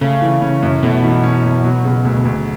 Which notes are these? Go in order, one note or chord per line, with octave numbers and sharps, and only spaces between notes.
C#3 A3
E3
C#4
F#2
B2 A3
E3
C#4
F#2
F#3
C#3
D2
D2